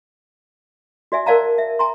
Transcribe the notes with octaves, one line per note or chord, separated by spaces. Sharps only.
F#4 D5 E5 G#5
A#4 C5 D5 F5 A5 A#5
E5
G#5 A#5 C6